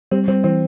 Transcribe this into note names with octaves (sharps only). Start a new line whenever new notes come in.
G3 C4
G3 C4
E3 C4